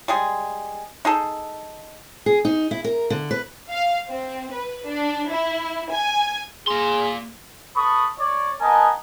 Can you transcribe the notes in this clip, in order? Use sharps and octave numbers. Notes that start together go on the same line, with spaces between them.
G3 G#3 G#4
D#4 G#4 A4
G#4
D#4
E4
A#4
D3
B4
F5
C4
B4
D4
E4
G#5
A#3 G#4 C6
A4 B4 B5 C#6 D#6
C#5 D5
B3 A#4 D#5 G#5 A5